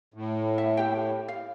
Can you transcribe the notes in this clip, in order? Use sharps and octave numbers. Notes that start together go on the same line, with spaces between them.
A2
E5
G4 G5
F5